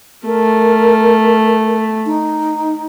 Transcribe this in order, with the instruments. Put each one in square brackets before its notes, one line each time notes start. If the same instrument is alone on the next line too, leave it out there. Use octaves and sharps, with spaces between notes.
[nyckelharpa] A3 [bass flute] A#4
[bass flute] D#4